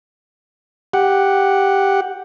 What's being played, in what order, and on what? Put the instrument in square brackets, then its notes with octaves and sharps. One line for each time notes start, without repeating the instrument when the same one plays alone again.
[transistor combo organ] G4 F#5